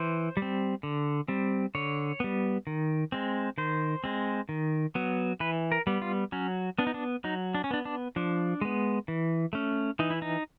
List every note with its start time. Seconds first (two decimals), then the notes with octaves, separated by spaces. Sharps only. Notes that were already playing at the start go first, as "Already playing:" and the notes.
Already playing: E3 C5
0.37 G3
0.42 C4
0.83 D3
1.28 G3 C4
1.75 D3 C#5
2.20 G3 B3
2.67 D#3
3.12 G#3 C4
3.58 D#3 C5
4.04 G#3 C4
4.49 D#3
4.95 F#3 B3
5.40 E3 B4
5.72 A#4
5.87 G3 B3
6.02 F4
6.32 F#3 C#4
6.78 B3 D4
6.87 D#4
6.94 D4
7.24 F#3 D#4
7.55 D4
7.64 C#4
7.71 B3 D4
7.85 D4
8.16 F3 D4
8.61 G#3 B3
9.08 E3
9.53 A3 C#4
9.99 E3 D#4
10.10 E4
10.22 D#4